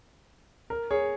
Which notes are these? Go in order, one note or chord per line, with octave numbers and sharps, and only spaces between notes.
A#4
G#4 C#5